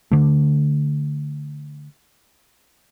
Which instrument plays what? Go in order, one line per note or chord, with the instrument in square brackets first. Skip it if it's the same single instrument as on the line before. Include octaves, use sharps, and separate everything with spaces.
[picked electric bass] D3 A3